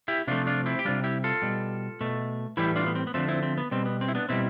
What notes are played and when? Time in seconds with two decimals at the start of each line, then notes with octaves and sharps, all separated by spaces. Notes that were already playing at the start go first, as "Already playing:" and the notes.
0.08 E4 G4
0.27 C3 F3 A3 D4 F4
0.47 D4 F4
0.66 C4 E4
0.79 G4
0.85 C3 G3 D4 F4
1.04 E4 G4
1.24 F4 A4
1.42 B2 G3
2.01 B2 A3
2.57 A2 E3 G3 E4 G4
2.76 D4 F4
2.87 B3
2.95 C4
3.07 B3
3.14 D3 F3 A3 C4
3.29 C4 E4
3.43 C4
3.58 B3
3.71 B2 G3 C4
3.86 B3
4.01 C4
4.08 E4
4.15 B3 D4
4.29 B2 G3 C4 E4